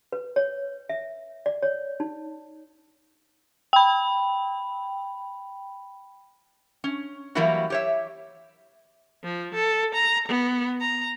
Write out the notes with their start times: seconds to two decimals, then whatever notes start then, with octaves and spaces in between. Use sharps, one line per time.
0.12 B4
0.36 C#5
0.89 E5
1.46 D5
1.63 C#5
2.00 D#4
3.73 G5 B5
6.84 C#4
7.35 E3 F#3 G3 A#3 E4 F#4
7.70 G4 C#5 E5
9.24 F3
9.55 A4
9.95 A#5
10.28 B3
10.81 A#5